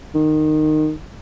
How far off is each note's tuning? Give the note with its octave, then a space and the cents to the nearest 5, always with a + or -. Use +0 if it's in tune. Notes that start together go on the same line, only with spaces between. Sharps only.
D#3 -15